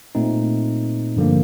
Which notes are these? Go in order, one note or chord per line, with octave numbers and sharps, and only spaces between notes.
A#2 A3 C4 D#4
G2 D3 F3 A#3